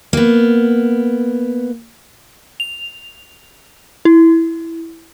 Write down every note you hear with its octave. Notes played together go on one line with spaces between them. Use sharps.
A#3 B3
F7
E4